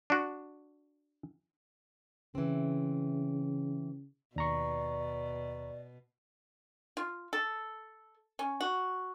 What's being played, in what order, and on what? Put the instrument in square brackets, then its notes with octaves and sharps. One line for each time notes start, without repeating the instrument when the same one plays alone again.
[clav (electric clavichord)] D4 F#4
[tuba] C#3 [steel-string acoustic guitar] E3 C4
[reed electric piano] D#2 A#5 C#6 [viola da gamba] B2 [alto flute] D5
[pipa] F4
A4
C#4
F#4